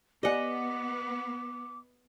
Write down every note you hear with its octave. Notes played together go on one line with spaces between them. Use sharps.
B3 G4 D5 D#5 F#5 G#5 D6